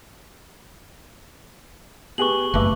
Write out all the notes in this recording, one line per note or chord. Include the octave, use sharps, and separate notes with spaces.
B3 G4 G#4 B4 C#6 F#7
F#1 A3 B4 E5 A5 D6